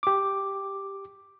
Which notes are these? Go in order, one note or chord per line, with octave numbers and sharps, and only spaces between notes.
G4 D6